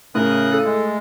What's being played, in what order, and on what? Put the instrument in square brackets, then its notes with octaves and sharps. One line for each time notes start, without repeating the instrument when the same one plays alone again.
[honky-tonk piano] A2 [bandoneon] C#3 D#6 F#6 [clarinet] A#4
[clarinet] A4
[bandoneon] G#3